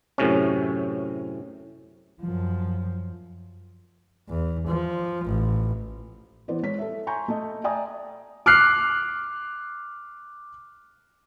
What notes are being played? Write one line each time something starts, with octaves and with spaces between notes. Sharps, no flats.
F#2 A2 C3 C#4
F#2 F3
E2
F3
A1
E3 B3 C5 D5
G#3 C#5 B6
A4 E5
G#5 A#5 C6 C#6 G6
A3 D#5
D5 E5 G5 G#5 A#5 D#6
D6 F6 F#6 C7